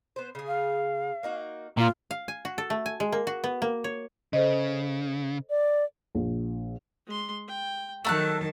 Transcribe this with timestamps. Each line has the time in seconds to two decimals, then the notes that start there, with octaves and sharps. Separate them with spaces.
0.16 B3 C5
0.35 C#3 G#4
0.47 F5
1.23 A#3 D#4 F#4
1.78 A#2 F4
2.11 F5
2.28 G#5
2.45 F#4
2.58 A4
2.70 A3
2.86 G#5
3.00 G#3
3.12 A#3
3.27 F#4
3.44 B3
3.62 A#3
3.84 C#5
4.33 C#3 A4 C5 D#5
5.50 D5
6.15 A#1
7.07 G#3 C6
7.47 G5
8.05 D#3 F#3 A3 A5 A#5 F#6